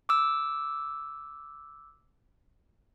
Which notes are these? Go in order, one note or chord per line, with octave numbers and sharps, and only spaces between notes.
D6 E6